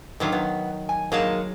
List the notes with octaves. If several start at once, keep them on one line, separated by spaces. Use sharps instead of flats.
D3 D#3 F#3 F4
F#3 B3
G#5
F#3 G#3 A#3 D#4 G#4 A5